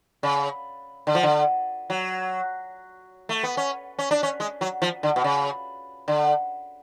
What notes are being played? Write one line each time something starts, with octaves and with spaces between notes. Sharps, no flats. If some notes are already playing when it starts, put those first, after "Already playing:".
C#3
D3
F3
D3
F#3
A3
B3
C#4
C#4
D4
C#4
G#3
F#3
F3
D3
B2
C#3
D3